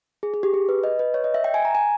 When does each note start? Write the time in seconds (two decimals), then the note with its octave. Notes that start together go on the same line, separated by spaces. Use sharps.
0.23 G#4
0.34 G#4
0.43 G4
0.54 G#4
0.69 B4
0.84 D#5
0.99 B4
1.14 C#5
1.24 D#5
1.34 E5
1.44 G5
1.54 G#5
1.65 A#5
1.75 G#5